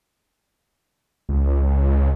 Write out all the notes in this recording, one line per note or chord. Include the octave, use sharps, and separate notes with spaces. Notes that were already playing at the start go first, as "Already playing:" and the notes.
C#2